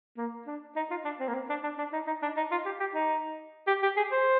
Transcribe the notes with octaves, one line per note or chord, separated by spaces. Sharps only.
A#3
D4
D#4
F4
D4
C4
A#3
C4
D4
D4
D4
D#4
D#4
D4
D#4
F4
G4
G4
D#4
G4
G4
G#4
C5